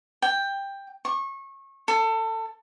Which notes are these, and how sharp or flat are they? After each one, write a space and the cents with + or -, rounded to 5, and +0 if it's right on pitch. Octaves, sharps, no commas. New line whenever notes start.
G5 +10
C#6 -25
A4 +25